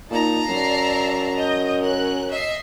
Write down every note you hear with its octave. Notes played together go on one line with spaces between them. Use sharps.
A#2 D#4 A5 A#5
F#2 D5 E5 C7
D#5 G6
C#4 A#4 F#6
D#5 E5 C7